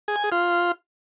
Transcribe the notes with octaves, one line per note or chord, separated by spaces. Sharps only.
G#4
G#5
G#4
F4